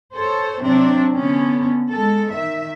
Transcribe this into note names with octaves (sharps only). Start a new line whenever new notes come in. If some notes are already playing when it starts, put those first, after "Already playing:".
A4 C5 C#5
C3 F#3 C4 D4
D3 B3 C#4
G#3 A4
D#3 E5